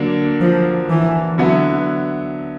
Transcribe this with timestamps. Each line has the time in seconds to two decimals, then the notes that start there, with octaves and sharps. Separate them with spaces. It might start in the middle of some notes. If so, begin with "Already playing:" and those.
Already playing: D3 F#3 A#3 D4
0.41 F3
0.89 E3
1.38 D3 F#3 B3 E4